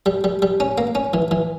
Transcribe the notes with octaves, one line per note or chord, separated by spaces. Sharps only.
G3
G3
G3
C#4
A#3
C#4
E3
E3